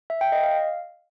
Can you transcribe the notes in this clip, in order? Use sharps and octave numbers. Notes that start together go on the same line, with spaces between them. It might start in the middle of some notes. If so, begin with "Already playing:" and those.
E5
G5
D#5
F5